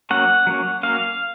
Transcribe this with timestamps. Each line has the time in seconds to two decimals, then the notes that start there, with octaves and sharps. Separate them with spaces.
0.10 F#3 A#3 C#4 F#5
0.47 F#3 A#3 C#4
0.83 F#3 A#3 C#4 F5